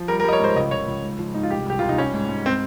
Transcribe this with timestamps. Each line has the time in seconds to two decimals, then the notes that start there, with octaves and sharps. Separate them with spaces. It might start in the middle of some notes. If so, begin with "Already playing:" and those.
Already playing: F3
0.08 G3 A#4
0.20 A#4
0.24 G3 D#5
0.33 C#5
0.40 G#2 C5
0.56 C#2 D#5
0.71 C#2 C#5
0.87 C#2
1.03 G#2
1.19 F3
1.34 G#2 D#4
1.43 F4
1.50 C2 G4
1.66 C2 G4
1.79 C2 F4
1.89 D#4
1.98 G3 C#4
2.14 G#2
2.29 G#2
2.46 C4